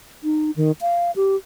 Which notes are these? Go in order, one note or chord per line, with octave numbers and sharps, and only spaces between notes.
D#4
D#3
F5
G4